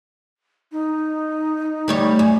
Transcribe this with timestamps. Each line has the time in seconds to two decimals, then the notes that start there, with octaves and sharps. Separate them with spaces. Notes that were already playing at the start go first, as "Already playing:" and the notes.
0.72 D#4
1.88 D2 G3 C#5
2.19 F#2 G#5